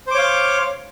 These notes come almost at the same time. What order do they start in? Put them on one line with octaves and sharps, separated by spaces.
C5 D6 C#5 F5